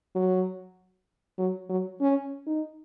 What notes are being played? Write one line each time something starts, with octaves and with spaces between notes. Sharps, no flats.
F#3
F#3
F#3
C#4
D#4